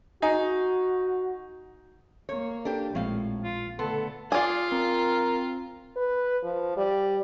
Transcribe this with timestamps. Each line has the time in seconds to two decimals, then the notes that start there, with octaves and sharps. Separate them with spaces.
0.22 D#4 F#4 G#4
2.29 A#3 C#5
2.65 D4 G4 A4 B4
2.95 A#1 A2 F3 G#3 C4 F5
3.44 F4
3.79 D3 A3 B3 A4 C6
4.32 F4 G#4 D5
4.72 C4 A#4
5.97 B4
6.43 F3
6.77 G3